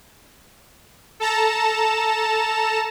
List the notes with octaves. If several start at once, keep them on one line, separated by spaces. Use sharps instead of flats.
A4 A5 A#5 E7